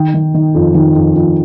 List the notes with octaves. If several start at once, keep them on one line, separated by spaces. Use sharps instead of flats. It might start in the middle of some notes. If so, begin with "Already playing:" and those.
Already playing: D#3 G5
D#3
D#3
F2
D#3
F2
F2